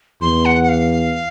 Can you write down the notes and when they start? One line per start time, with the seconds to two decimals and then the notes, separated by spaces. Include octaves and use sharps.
0.21 E2 C6
0.45 F#5
0.63 F#5
0.69 F5